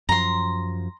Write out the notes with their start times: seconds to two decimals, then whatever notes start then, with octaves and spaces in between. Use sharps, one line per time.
0.09 F#2 F3 A#5 C6